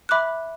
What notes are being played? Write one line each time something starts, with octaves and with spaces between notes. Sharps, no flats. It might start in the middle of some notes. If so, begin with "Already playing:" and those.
E5 B5 D6 F#6